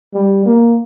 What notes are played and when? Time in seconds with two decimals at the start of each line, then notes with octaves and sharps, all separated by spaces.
0.14 G3
0.45 A#3